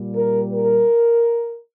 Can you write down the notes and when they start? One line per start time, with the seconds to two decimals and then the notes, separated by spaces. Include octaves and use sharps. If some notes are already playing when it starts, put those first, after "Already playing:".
Already playing: A#2 G3
0.16 A#4
0.53 A#4